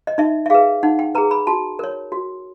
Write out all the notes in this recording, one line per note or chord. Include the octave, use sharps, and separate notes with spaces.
D#5
D#4 E5
E5
G#4 B4 F5
D#4 F#5
G5
G#4 B4 A#5
B5
F#4 A5
A#4 C#5
F#4